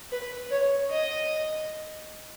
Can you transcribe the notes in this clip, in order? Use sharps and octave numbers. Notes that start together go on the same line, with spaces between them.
B4
C#5
D#5